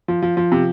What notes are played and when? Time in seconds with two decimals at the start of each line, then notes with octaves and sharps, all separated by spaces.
0.08 F3
0.22 F3
0.37 F3
0.52 C3